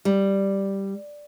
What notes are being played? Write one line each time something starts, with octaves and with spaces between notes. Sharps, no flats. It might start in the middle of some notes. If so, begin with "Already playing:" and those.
G3